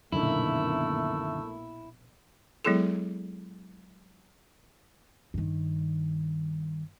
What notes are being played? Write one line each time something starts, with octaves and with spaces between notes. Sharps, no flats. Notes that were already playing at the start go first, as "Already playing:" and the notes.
A#1 F#2 B2 D3 D#3 A3 A#3 E4
F#3 G#3 B3 E4 G#4 A4
G2 D#3